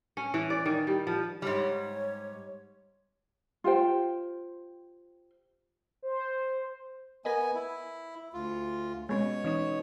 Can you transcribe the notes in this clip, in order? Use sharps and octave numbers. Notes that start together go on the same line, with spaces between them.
C#4
E3
D5
D#3
G3
F3
G#2 G3 C#5
F4 G4 C5 G5
C5
B3 A#4 B4 D#5 G#5
E4
D2 F4
B2 G#3 B3 C#4 C#5
E3 C#4 D#4